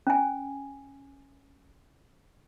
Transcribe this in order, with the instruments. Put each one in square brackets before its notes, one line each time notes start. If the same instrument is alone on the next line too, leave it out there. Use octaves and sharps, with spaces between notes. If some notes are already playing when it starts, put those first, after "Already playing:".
[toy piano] C#4 G#5